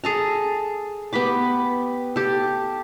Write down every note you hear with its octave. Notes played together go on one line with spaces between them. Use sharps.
G#4 A4 A#5
B3 G4 B5 D6
G4 A4